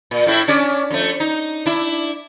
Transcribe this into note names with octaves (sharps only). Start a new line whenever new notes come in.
A#2
A2 E4 E5
C#4 D4 D5
F2 A3
D#4
D4 E4